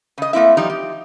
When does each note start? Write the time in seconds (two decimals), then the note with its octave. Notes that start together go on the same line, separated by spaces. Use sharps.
0.18 C#3 D#5
0.33 A3 A#3 C4 E4 E5
0.57 F3 G3 D#4 G4
0.70 G4